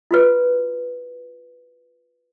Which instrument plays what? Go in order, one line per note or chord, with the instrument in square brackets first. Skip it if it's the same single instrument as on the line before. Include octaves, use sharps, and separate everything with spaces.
[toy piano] F4 F#4 B4